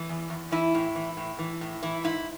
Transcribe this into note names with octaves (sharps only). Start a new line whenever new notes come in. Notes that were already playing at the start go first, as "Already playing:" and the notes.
Already playing: E3
E2
E2
E3 E4
A2
E3
A2
E3
A2
E3 E4
G#2 E4